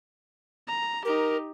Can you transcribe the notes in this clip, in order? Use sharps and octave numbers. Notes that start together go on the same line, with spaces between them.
A#5
D#4 G4 A#4